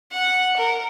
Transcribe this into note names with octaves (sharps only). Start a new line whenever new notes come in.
F#5
A#4